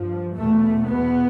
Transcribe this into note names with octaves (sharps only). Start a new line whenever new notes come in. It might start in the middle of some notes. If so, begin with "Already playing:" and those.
Already playing: G2 F3
E2 B2 A3
E2 B2 B3